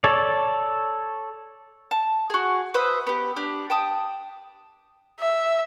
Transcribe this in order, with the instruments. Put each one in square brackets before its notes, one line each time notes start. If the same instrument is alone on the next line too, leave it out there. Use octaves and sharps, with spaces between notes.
[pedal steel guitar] A4 C#5 D5
[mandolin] A5
F#4 G#4
B4 C5 E5 D#6
B3 G4
D4 G4
G5 A5 D#6
[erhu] E5